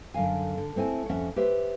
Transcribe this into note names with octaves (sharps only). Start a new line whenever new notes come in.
F#2 D3 F5 G#5
D3
A3 C4 E4 G#5
F2 C#4 E5 F#5
G4 B4 C5 E5